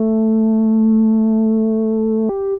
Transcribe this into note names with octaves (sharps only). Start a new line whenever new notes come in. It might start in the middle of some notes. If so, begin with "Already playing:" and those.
Already playing: A3
G4